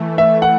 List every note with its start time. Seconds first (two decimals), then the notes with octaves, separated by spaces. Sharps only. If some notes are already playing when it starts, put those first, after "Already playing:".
Already playing: E3 A3
0.18 E5
0.42 F#5